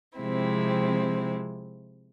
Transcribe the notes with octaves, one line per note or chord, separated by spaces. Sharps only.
C3 F3 G#3 C4 E4